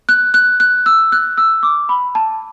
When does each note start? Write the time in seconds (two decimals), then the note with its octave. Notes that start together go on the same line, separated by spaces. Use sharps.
0.09 F#6
0.34 F#6
0.60 F#6
0.86 E6
1.12 F#6
1.38 E6
1.63 D6
1.89 B5
2.15 A5